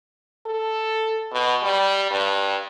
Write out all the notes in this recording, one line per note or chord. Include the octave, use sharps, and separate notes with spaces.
A4
B2
G3
G2